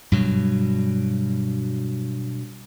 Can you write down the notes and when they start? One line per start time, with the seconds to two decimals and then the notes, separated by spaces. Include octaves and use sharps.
0.12 G2 B2 F#3